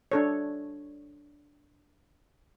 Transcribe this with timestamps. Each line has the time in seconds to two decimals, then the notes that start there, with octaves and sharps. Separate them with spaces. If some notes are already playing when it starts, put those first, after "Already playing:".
0.12 D4 A4 C#5